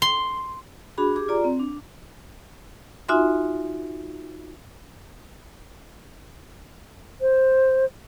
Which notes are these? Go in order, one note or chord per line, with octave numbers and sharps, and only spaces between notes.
C6
D4 F#4 G#4 B5
G4 G#4 D6
F4 D5 A#5
C4
D4
D#4 F4 F#4 E5 G#5 C6
C5